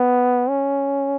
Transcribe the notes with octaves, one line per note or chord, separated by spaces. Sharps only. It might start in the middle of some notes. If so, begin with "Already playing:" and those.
Already playing: B3
C#4